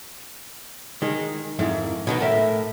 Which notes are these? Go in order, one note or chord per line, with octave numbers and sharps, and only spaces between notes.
D#3 G#3 G#4
F2 G#2 D#3 E4
B2 D#3 B3 F#5
A2 A#4 E5